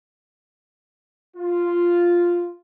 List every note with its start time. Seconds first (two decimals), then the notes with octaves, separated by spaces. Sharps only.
1.37 F4